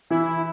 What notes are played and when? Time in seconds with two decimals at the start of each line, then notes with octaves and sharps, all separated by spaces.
0.10 E3 E4